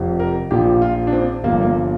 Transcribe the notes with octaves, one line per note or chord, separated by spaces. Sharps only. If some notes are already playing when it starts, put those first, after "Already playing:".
Already playing: F1 F2 F3
A#4
A#1 A#2 F3 G4
F4
D4
C4
G1 G2 F3 A#3
G3
A#3